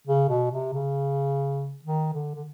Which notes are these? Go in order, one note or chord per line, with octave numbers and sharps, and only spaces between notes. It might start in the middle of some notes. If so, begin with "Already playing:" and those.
C#3
B2
C3
C#3
D#3
D3
D3